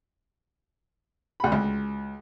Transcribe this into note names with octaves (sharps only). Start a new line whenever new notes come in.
D2 B5
C#2